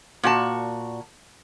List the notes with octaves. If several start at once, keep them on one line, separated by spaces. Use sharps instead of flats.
A#2 F#4 A5